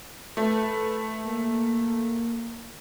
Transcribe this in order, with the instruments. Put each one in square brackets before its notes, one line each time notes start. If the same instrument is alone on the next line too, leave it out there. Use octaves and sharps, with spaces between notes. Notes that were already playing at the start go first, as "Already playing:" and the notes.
[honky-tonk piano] A3 [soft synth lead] B4
[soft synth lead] A#3